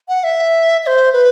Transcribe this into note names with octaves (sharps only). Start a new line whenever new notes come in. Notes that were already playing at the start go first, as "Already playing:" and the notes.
F#5
E5
E5
C5
B4